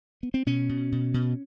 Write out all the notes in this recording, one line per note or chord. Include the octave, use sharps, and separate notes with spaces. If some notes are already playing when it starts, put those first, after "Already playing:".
B3
C4
B2 C#4
B2
B2
B2